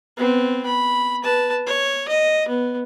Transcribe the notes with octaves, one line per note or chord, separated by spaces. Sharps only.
B3 C4
B5
B4 A5
C#5
D#5
B3